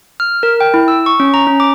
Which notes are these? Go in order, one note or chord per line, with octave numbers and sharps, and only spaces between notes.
F6
A#4
G5
E4
E6
C#6
C#4
A#5
C#4
D6